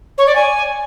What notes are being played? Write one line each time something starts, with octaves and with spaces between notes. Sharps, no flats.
C#5
D5
G#5